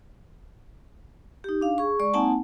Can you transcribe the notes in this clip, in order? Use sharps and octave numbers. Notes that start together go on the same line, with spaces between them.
D#4 G4
D4 F5
G#4 C#6
G#3 D5 C#6
A#3 C4 D#4 F#5 G#5 A5